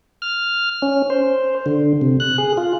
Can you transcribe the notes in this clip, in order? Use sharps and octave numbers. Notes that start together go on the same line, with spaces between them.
F6
C#4
C5
D3
C3
F#6
G#4
F4